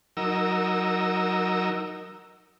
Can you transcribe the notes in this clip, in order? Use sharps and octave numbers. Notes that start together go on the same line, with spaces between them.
F#3 D#4 A#4 E6